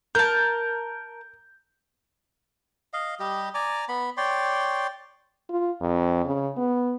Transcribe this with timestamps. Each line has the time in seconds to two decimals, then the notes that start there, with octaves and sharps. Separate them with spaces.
0.15 A#4 A5 G6
2.93 D#5 F5
3.20 G3 G4 D#5
3.54 D5 G#5 A#5 D6
3.88 B3 B5
4.17 C#5 D5 G5 C6
5.49 F4
5.81 F2
6.25 C#3
6.57 B3